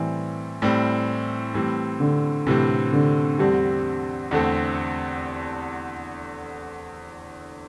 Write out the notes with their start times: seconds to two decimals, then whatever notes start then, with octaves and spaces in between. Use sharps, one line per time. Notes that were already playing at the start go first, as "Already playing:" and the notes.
Already playing: A2 E3 G3 C4
0.62 A2 G3 C4
1.54 A2 E3 G3 C4
2.00 D3
2.47 A2 C3 E3 C4
2.93 D3
3.39 E2 D3 G3 A3 C4
4.31 E2 D3 A3 C4